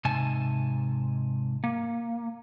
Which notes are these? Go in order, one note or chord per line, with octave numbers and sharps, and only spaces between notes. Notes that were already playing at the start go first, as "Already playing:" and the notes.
G#2 C3 G#5 A5
A#3